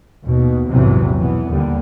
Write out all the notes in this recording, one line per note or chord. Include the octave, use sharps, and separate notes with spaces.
D#2 B2
A#1 E2 G#2 C3 E3 F#3
B2 E3 B3
D#2 D3 G3